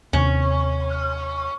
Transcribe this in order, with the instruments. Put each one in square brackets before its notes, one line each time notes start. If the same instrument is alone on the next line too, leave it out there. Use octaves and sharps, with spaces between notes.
[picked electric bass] D#2 C3 C4 [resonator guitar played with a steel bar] C#4